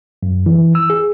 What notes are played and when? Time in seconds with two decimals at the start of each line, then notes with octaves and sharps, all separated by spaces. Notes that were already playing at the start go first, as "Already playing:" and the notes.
0.23 F#2
0.46 E3
0.75 E6
0.90 G#4